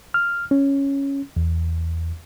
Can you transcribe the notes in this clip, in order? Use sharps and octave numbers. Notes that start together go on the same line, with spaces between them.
F6
C#4
E2